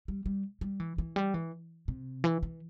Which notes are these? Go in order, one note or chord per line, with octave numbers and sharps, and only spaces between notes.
G3
G3
G3
E3
E3
G3
E3
C3
E3
E3